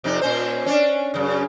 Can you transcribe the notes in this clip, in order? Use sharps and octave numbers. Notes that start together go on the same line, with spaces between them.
F2 C3 D#4
A#2 C#4 C5
C#4 D4
F#2 C#3